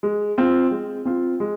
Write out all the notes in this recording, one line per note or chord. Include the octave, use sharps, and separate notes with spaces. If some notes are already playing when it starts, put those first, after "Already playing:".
G#3
C4 F4
G#3
C4 F4
G#3